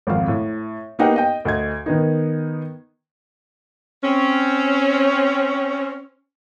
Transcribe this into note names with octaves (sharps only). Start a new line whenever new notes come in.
G#1 F2 F5
A2
A#3 B3 D#4 G4 F#5 G5
D#5 G5
D2 D#5 G#6
D#3 B3 D#4
C4 C#4